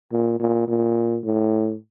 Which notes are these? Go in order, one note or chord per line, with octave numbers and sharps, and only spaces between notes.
A#2
A#2
A#2
A2